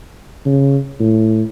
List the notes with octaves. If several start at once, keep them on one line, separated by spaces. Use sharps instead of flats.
C#3
A2